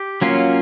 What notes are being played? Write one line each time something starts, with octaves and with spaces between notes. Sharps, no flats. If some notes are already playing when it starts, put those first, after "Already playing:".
Already playing: G4
F#3 A#3 C#4 F4